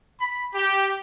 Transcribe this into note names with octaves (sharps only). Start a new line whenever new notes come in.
B5
G4